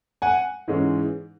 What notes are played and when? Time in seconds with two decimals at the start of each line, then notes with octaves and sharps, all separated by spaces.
0.22 F#5 G#5
0.68 G#2 E3 G#3 C#4